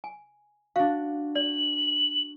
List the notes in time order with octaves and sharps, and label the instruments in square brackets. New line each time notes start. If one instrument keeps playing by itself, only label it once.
[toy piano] G#5
[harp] D4 F#4 [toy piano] F5
[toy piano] D5 [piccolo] F#7